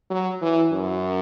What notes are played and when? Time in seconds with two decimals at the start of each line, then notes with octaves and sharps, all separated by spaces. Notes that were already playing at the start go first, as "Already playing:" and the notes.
0.10 F#3
0.42 E3
0.73 F#2